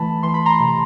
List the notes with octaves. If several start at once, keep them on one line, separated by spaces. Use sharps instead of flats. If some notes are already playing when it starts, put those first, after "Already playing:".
Already playing: E3 A3 A5 B5
E3 C6
B5
A#5 C6
C3